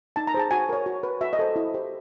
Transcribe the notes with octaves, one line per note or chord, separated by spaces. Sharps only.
D#4 A5
A#5
G#4 C5 A5
F#4 G#5
A#4 C#5
F#4
B4
F#4 E5
D#5
A4 C5
E4
G4 C5